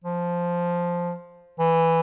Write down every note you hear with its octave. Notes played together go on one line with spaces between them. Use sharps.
F3
E3